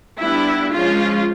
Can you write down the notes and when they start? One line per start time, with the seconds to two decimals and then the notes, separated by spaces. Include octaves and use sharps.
0.20 G3 B3 D4 E4
0.73 F3 G#3 C#4 F4